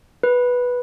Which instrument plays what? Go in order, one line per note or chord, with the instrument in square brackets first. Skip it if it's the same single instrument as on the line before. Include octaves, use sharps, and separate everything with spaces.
[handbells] B4